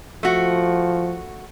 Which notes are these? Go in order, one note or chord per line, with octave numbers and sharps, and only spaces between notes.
F3 A3 F#4